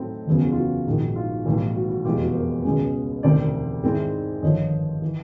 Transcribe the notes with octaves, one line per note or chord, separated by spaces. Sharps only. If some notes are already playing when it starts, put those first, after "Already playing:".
Already playing: A2 F#3 A3 C4 D#4 A4
F#1 E2 C#3 F#3 B3
F#4
F4
F#4
A#1 G#2 D#3
F4
B1 A2 E3 G3
F#4
F#4
F1 E2 B2 G#3 F4 G4
F#4
A#4 C5
C#2 B2 G#3 C#4
E1 D2 C3 D#3 C5 D5
G#2 D#3 G#3 C4 E4
G#1 G2 D3 F3 C#5 D#5
E3